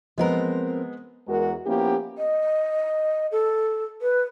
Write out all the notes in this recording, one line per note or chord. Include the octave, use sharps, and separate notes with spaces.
F3 G#3 B3 C4 A#4
E2 G#3 F#4 A#4
F3 A#3 B3 C#4 E4 G4
D#5
A4
B4